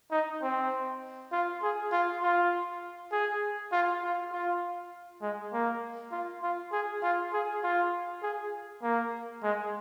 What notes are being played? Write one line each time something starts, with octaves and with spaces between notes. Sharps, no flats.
D#4
C4
F4
G#4
F4
F4
G#4
F4
F4
F4
G#3
A#3
F4
F4
G#4
F4
G#4
F4
G#4
A#3
G#3